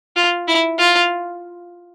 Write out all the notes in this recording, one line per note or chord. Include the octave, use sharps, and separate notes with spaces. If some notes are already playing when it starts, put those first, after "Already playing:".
F4
E4
F4